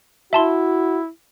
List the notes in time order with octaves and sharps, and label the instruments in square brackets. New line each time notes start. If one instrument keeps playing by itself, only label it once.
[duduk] E4 [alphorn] F#4 [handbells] E5 A5 C6